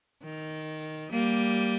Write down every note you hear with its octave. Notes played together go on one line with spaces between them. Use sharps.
D#3
G3 A#3